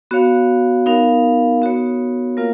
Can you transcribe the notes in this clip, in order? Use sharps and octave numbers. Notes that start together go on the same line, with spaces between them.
B3 F#4 C#5 F5
B3 D#4 A#4 F5
B3 F#4 C#5
A#3 F4 A#4 F5